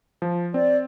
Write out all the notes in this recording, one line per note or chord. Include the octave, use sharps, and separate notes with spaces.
F3
C4 D5